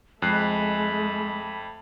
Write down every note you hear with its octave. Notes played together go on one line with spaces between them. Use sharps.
F2 G#3 A3 B5 F#6 C7